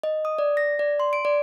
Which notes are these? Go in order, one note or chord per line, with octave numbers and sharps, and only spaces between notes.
D#5
D#6
D5
A#6
D5
C6
D7
D5